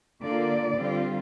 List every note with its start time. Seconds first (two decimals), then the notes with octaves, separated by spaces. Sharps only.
0.23 D3 A#3 F4 D5
0.76 D3 G3 C4 F4